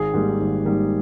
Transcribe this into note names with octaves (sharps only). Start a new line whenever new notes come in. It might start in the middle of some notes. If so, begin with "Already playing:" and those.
Already playing: G#1 G#4
G#2 G3 A#3
G#1
G#2 G3 A#3